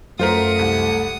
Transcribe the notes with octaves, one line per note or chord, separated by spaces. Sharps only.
F#2 A3 F4 A#4 C5 F#5 D#6 B6
C2